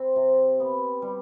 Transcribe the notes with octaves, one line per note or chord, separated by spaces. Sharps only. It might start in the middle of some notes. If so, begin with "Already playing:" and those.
Already playing: C4
C3
B3
G3